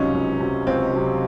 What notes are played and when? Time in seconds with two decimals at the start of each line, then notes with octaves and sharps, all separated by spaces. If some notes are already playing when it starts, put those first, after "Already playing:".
Already playing: C#2 C3 F#3 C#4 D#4
0.14 C#2
0.40 C3 F#3
0.67 C#2 C4
0.93 C3 F#3